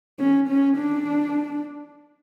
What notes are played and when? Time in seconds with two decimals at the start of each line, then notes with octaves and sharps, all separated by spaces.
0.19 C#4
0.49 C#4
0.78 D4